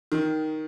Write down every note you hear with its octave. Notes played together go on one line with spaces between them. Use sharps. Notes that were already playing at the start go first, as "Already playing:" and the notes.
D#3